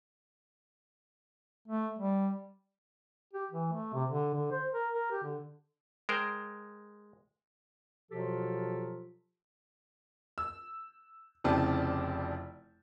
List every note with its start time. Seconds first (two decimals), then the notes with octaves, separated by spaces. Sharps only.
1.68 A3
1.99 G3
3.33 G4
3.51 E3
3.72 A3
3.94 C3
4.10 D3
4.34 D3
4.51 C5
4.73 A#4
4.94 A#4
5.11 G4
5.23 D3
6.09 G#3 A#4 C5 G5
8.11 B2 F3 F#3 F4 G4 A4
10.38 E6
11.44 F1 C#3 C4 E4 D5 A5